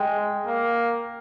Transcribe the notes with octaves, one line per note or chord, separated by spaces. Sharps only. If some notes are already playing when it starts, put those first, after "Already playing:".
Already playing: G#3 G5
A#3